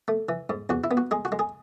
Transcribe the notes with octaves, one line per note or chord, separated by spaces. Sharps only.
A3
E3
G#2
E2 F#4
E4
B3
F#4
G#3 G#4
F#4
G#3
G#4